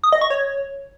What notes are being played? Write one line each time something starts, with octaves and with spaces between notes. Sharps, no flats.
D#6
D#5
C#6
C#5